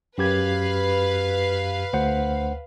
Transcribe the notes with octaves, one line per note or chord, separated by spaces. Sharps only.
F#2 G4 B4 F5 G#6
D2 C5 F#5